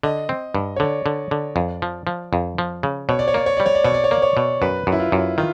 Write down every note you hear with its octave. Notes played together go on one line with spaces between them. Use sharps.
D3 D#5
C4
G2
C#5
D3 D5
D3
D3
F2
F3
F3
F2
F3
C#3
B2 C#5
D5
C#5
A#3 D5
C#5
G3 D5
C#5
D5
B2 C#5
D5
C#5
A#3 D5
C#5
B2
F#2 B4
F#2
E4
F4
F#2
D#3 F4